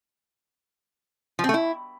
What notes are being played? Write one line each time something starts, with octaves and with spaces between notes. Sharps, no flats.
F3
C4
A3
E4